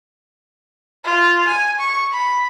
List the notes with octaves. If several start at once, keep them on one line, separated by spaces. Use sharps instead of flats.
F4
G#5
C#6
B5